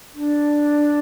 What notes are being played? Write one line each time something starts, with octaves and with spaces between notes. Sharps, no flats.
D4